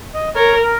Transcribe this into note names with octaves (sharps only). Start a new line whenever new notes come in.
D#5
A#4 C#5
A#4